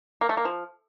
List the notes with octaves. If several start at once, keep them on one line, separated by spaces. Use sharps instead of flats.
A#3
A3
A#3
F3